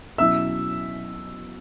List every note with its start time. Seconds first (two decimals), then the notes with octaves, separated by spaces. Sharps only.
0.18 B2 F#3 C#4 E4 E5 E6